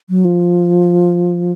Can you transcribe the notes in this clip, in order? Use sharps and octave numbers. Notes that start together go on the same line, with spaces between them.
F#3
F3